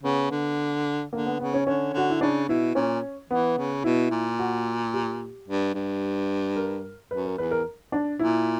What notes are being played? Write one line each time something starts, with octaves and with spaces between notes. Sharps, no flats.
C#3 B3
D3
D3 A#3
B3
C#3 B3
C#4
D3 C#4
D3 F#4
E4
C#3 D4
B2 E4
A#2 C#4
E3 B3
C#3
B2 E4
A#2
F#4
G4
G2
G2
A#4
F#2 B4
A#4
E2 B4
A#4
D4
A#2 E4